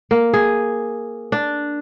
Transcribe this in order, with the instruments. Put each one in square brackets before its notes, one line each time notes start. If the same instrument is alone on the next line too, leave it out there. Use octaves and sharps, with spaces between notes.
[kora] A#3
G#4
D4